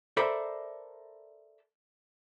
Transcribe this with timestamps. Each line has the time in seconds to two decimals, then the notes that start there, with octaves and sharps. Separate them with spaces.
0.17 A4 A#4 C5 D5 E5 B5